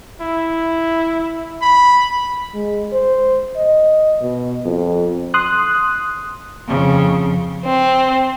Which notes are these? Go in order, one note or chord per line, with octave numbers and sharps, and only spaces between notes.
E4
B5
G#3
C5
D#5
B2
F2
C6 D#6 F#6
F2 C#3
C4